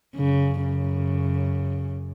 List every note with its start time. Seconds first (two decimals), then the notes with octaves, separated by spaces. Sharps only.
0.15 F#2 C#3
0.63 C#3